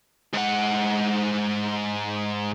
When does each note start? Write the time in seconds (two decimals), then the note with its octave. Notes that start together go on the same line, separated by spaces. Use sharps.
0.33 G#2 F#5